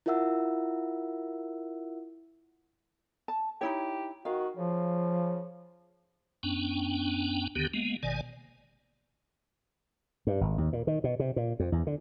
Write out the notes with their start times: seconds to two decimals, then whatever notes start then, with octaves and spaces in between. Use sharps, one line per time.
0.06 E4 F4 A#4 E5 F#5 E6
3.28 A5
3.61 D#4 E4 G4 C#5
4.25 D#3 F#4 F5
4.57 C#3 F3
6.43 F#2 B3 C#4 D4 G5
7.55 D#2 D3 D#3 B3 G4
7.74 G#3 A#3 B3
8.03 G#1 B2 D#3 D5 G#5
10.27 G2
10.41 G#1
10.58 D#2
10.73 A#2
10.87 D#3
11.04 B2
11.19 C3
11.36 A#2
11.60 F2
11.72 E2
11.87 D3